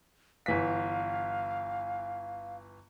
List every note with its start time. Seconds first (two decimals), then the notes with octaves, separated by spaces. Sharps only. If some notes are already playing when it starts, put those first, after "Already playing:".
0.46 G1 E3 F5 B6